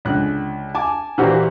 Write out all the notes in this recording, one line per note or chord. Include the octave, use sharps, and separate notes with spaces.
C#2 D3 F#6
G#5 A5 D6
A#2 E3 A#3 C4 F#4 G4